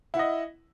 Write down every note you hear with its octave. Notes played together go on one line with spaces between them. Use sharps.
E4 D#5 F#5